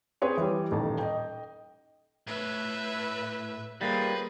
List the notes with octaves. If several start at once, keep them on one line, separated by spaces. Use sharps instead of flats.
C4 G#4 B4 C#5 C6
E3 G3
D#1 A1 D#4 A5
D#5 G5
A2 B4 E5
G3 A#3 G#4 B4 C5